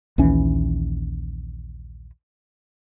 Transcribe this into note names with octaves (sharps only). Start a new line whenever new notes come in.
A#1 D#2 E3 C#4